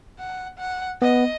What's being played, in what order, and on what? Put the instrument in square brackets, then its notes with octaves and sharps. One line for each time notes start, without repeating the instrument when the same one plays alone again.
[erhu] F#5
F#5
[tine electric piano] B3 [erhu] D#5